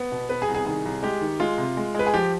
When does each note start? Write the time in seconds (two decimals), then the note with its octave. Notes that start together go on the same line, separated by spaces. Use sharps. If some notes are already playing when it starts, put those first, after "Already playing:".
Already playing: B3
0.12 B2
0.29 B3 B4
0.42 G#4
0.48 C2
0.55 G#4
0.66 D#3 G#4
0.85 C2
1.03 G#3 G4
1.21 D#3
1.40 G#3 F4
1.58 C3
1.77 G#3
1.94 G#3 B4
2.07 G#4
2.14 F3 G4